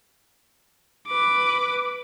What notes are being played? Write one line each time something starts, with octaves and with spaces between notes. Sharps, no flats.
B4 D6